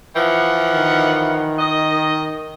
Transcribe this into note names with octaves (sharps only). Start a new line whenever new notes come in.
E3 F3 F#5
D#3
D#5